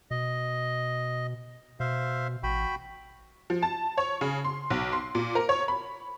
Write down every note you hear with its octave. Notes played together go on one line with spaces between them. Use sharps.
B2 D#5
B2 C5 E5 F5
A1 F#4 G5 B5
F3
A5
C#5
C#3
C6
B1
C6
A#2
A#4
C#5
B5